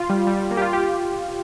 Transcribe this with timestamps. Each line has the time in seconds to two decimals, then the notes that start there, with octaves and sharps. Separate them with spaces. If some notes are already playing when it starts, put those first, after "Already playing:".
Already playing: F4
0.10 G3
0.27 G3
0.39 G3
0.51 A#3
0.57 G4
0.62 F4
0.73 G4
0.84 G4